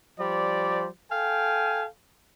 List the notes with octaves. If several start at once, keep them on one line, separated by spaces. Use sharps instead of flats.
F3 G3 C5 D5
A4 F5 G5 G#5